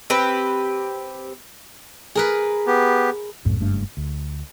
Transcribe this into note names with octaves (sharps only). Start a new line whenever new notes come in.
C4 G4 B4
G#4 A#4 B4
B3 G4
C2 F#2 A2
F#1 G2 A3 D4
D2